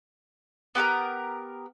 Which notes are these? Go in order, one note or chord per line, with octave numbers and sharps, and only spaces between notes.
B3 G4 A4 A#4